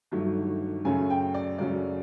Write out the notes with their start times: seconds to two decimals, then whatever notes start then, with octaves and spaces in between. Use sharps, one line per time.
0.12 G1 G2 D#3 F#3 A3
0.85 F#2 C#3 F#3 A3 C#4 G#5
1.10 G5
1.34 D5
1.58 F#2 C#3 F#3 A3 C#4 D5